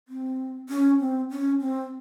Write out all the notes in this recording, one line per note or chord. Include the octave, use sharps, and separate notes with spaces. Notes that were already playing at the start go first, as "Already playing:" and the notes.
C4
C#4
C4
C#4
C4